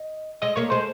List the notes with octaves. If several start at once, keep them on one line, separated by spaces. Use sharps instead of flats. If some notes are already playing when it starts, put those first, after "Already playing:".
Already playing: D#5
G#3 D#5
A#3 C#5
G#3 C5